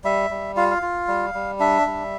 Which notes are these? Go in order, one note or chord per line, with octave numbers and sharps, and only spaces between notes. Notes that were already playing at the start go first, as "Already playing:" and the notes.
G3 E5
G3
F4 F5
F5
F4
G3
G3
D4 E5
G3